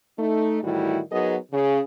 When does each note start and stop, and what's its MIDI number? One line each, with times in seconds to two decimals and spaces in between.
0.19 0.58 57
0.19 0.58 63
0.63 1.00 45
0.63 1.00 51
0.63 1.00 52
0.63 1.00 55
0.63 1.00 64
0.63 1.00 66
1.11 1.36 54
1.11 1.36 59
1.11 1.36 63
1.11 1.36 68
1.11 1.36 70
1.11 1.36 75
1.52 1.80 49